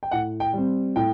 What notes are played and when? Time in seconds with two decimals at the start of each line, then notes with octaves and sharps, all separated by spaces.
0.03 G5
0.11 A2 F#5
0.40 G5
0.53 G3 C4
0.96 A2 G5